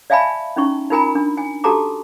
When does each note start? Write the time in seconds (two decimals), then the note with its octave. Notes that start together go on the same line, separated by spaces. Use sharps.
0.10 D5 E5 F5 G#5 A5 B5
0.56 C#4 D#4 E4 C#6
0.90 D#4 F4 A#4 G#5 A#5 B5
1.15 D4
1.37 G#5
1.64 F#4 G4 A4 A5 A#5 D6